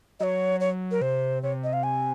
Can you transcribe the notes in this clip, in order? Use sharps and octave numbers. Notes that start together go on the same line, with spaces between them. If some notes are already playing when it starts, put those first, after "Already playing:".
F#3 C#5 D#5
C#5
A#4
C3 C5
C3 C#5
D#5
F5
G#5